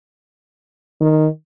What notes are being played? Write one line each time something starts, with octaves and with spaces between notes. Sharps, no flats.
D#3